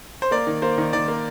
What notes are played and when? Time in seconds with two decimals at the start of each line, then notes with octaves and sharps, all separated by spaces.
0.22 C5
0.31 A#3 D5
0.47 D#3
0.62 A#3 C5
0.78 D#3
0.93 D#3 D5
1.08 A#3